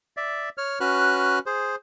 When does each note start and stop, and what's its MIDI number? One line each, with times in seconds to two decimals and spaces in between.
0.17 0.49 74
0.17 0.49 76
0.58 0.79 73
0.58 0.79 89
0.80 1.39 61
0.80 1.39 66
0.80 1.39 71
0.80 1.39 89
0.80 1.39 90
1.46 1.75 68
1.46 1.75 72